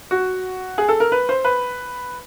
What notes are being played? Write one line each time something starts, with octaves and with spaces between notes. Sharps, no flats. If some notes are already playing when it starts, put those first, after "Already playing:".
F#4
G#4
A4
A#4
B4
C5
B4